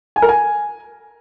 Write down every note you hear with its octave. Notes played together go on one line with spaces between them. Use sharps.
G#5
A#4
G#5